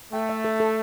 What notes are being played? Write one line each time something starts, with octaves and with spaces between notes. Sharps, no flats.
A3 G5
E5
A4
A4